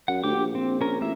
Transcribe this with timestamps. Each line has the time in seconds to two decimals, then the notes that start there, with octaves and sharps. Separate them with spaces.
0.08 F#2 F#5
0.24 D2 G4 D6
0.36 A#1
0.55 C4
0.81 C#4 A#4
1.01 A1 A#3 E5